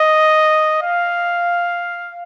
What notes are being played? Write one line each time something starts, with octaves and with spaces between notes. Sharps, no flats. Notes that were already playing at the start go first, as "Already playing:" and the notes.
Already playing: D#5
F5